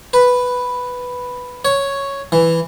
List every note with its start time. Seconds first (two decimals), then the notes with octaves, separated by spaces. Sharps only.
0.13 B4
1.65 C#5
2.32 E3